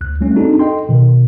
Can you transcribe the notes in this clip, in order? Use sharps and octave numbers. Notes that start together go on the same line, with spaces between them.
D2 F#6
G3 A3 C#4 D4
C4 D4 D#4 F#4 G#4 A4
A4 D#5 G5 C6
B2 D#3